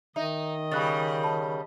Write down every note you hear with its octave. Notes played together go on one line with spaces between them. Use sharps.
D#3 D#4 D#5 E5
C#3 G3 B5 F#6 A6
A5 B5